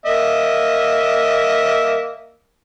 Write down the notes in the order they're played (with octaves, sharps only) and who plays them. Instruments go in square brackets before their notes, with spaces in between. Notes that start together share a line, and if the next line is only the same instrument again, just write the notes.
[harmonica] A#3 D#5 E5